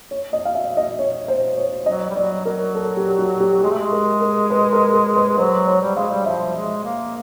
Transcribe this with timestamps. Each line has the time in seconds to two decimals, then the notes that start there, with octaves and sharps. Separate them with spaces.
0.11 C#5
0.33 D#5
0.45 F5
0.55 E5
0.77 D#5
0.99 C#5
1.28 C5
1.57 C#5
1.86 F#3 D#5
2.10 G3
2.15 F#3 D5
2.45 F#3 A#4
2.75 A4
2.97 G4
3.18 F#4
3.40 G4
3.63 G#3 G#4
3.70 A3
3.78 G#3
3.92 A#4
4.21 A#4
4.50 B4
4.72 A#4
4.94 A#4
5.16 B4
5.37 F#3 C5
5.67 C#5
5.81 G3
5.96 G#3 F5
6.10 G3
6.26 F3 E5
6.56 G#3
6.84 A#3